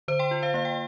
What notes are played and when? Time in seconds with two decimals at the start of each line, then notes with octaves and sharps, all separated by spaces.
0.08 D3 C5
0.19 G5 C6
0.31 F4
0.43 C5 F5
0.54 A#3 F5
0.65 G5